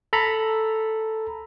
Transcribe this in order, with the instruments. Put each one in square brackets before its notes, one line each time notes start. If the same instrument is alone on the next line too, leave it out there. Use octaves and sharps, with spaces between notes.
[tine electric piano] A4 A#5 B5